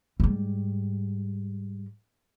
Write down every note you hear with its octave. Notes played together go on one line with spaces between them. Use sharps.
G#2 G3